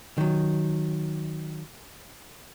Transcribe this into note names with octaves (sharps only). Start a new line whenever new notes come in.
D#3 F#3